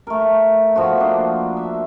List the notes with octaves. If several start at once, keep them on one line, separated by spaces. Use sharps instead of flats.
A3 A#4
B2 F3 A3 F#4
A#3 D4 C5 D#5
E5